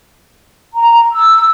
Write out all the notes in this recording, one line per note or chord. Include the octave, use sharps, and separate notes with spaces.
A#5
E6